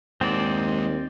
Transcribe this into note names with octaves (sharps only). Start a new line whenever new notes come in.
D#2 G#3 C4 D5 F#5